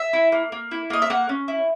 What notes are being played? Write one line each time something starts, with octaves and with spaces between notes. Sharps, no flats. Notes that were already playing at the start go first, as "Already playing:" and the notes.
Already playing: E5
E4
A#3
A#3
E4
A#3 D#5
E5
A#3 F#5
C#4
E4